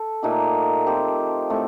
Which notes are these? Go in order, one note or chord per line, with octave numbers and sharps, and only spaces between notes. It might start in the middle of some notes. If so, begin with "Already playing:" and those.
Already playing: A4
A#2 A3 D#4 G4
F3 C4 G4 C5
A2 A3 C4